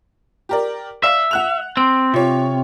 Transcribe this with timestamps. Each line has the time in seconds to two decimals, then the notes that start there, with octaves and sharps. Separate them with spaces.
0.49 G4 A#4 D5
1.03 D5 E5 F5
1.31 F#5 F#6 F7
1.77 C4 D7
2.14 C3 F4 C#5